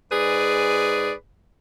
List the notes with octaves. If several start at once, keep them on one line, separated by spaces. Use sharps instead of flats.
G#2 G#4 B4 D5